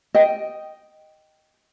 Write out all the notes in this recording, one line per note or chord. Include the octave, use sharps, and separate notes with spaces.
D#5 G5